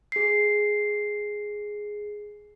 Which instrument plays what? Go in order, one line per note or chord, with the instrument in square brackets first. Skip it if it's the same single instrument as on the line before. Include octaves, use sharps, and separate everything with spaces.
[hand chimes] G#4 C7